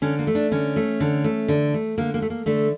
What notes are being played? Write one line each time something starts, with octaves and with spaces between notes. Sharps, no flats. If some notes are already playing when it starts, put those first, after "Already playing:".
D3 C#4
A#3
A3
D4
D3 C#4
A3
D3
A3
D3
A3
D3 A#3
A#3
A3
A#3
D3 A3